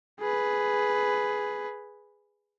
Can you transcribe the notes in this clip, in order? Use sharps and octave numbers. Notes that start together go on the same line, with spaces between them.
G#4 B4